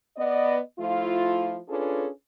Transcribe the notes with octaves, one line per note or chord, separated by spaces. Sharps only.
B3 D5 D#5
F3 A3 E4 F4
C#4 D4 F4 G#4 A4 B4